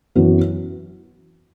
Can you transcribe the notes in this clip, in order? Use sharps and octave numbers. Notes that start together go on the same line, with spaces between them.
F#2 E3 B3